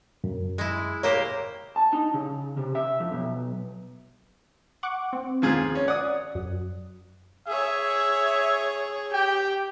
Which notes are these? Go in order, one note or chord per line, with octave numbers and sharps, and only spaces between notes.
F#2
G#3 E4
A#3 G4 C5 C#5
A5
D#4
C#3
C3
E5
F2
B1
F#5 C#6 D6
C4
D#2 F3 G#4
C#4
D5 F#5 D#6
F#2
G#4 C#5 E5
G4 G5